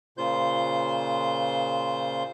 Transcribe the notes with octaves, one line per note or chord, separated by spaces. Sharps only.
A#2 C#3 F4 C5 G6